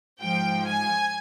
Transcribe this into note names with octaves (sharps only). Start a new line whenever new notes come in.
G#2 F3 G5
G#5